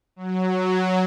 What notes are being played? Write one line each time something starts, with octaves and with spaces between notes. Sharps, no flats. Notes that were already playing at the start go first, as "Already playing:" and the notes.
F#3